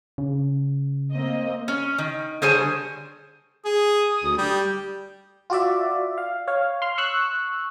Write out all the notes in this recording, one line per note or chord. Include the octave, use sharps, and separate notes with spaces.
C#3
A#3 C4 D#5
C#4
D#3
D3 G3 G#4 C5 C#5 G#5
G#4 D#6
D2
G3 G5
F4 F#4 D5 E5
F5
C#5 F5
C6 F6
C#6 E6 F#6